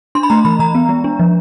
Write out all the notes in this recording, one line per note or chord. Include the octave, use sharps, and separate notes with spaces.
D4 C6
B5
A3 A#5
E3 B5
E3 A#5
B3
G#3
D4
F3